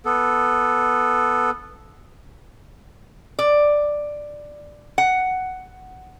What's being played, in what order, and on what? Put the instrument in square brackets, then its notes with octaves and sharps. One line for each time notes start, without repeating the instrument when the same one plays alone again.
[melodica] B3 A4
[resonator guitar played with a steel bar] D5
F#5